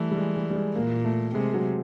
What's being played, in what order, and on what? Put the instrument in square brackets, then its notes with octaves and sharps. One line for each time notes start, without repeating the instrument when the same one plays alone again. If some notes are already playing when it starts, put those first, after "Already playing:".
Already playing: [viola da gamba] E3 [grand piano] G3 A3
[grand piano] G3
G#3
G3
G3
G#3
[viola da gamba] A#2 [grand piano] A#3
[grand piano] A3
[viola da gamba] C3 [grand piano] G#3
[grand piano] F#3